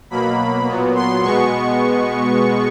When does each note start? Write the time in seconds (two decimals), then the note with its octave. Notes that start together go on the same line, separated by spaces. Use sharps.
0.10 B2 F#3 A#3 B5
0.68 A#2 F#3 B3
0.95 C6
1.23 B2 G#3 B3 C#6